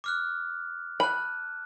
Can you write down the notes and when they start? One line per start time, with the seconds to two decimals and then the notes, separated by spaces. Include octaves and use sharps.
0.04 D6 F6 F#6
1.00 A5 B5 F#6